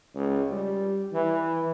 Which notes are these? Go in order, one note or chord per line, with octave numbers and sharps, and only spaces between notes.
C#2
G3
E3